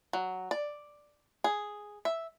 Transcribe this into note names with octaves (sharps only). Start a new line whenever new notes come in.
F#3
D5
G#4
E5